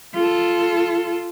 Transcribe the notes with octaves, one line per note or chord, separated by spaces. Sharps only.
F4 A4